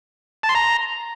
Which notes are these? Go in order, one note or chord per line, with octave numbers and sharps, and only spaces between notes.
A5
C6
A#5